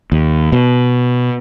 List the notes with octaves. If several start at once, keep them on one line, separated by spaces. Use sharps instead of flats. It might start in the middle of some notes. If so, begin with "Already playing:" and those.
D#2
B2